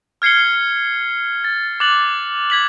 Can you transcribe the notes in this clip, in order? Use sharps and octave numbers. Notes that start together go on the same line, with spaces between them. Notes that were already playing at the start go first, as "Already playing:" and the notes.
F6 G#6 C7 C#7 G7
A6
D6 F#6 A6 F#7
G#6 B6 F#7